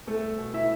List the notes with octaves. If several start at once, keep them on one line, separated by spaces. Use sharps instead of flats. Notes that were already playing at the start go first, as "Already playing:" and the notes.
C2 A3 A4
B2
E4 E5